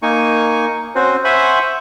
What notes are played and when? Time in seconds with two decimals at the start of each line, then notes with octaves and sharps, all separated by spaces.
0.02 A#3 D#4 G#5 C#6
0.95 C4 C#4 F#4 C5
1.25 C5 E5 F#5 G#5 B5 C#6